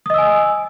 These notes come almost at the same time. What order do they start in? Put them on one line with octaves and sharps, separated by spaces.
D#6 D#5 E6 G#5